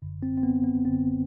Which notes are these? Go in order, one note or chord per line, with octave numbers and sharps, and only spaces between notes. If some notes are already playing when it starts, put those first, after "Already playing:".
G1 F#2 D3
C4
C4
B3
B3
G1 F#2 D3 C4